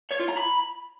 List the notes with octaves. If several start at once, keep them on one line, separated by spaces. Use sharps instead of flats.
C#5
F4
A#5
B5